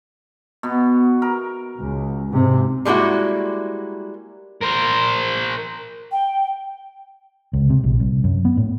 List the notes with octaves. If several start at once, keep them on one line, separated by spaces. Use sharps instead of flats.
B2 B3
A#4
C#2
G#2 C3
G3 G#3 A#3 E4 F#4
A#4 C5
G5
C#2
C3
A#1
C2
F#2
B3
A2